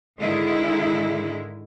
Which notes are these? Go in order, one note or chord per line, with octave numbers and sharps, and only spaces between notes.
G#2 D3 D#3 G#3 D#4 E4